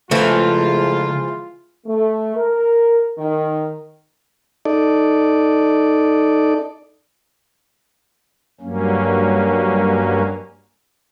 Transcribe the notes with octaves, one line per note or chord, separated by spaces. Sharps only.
C#3 E3 F3 G#3 A3 E4 F4
A3
A#4
D#3
D#4 A4 D5
G2 F#3 A#3 C#4